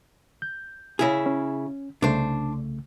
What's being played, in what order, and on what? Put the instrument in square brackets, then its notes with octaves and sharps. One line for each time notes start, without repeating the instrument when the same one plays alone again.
[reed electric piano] G6
[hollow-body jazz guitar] C#3 E4 G#4
[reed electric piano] C#4
[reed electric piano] C2 C#3 A3 [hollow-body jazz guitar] D4 C5